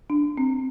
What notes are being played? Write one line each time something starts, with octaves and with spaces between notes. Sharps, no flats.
D4
C4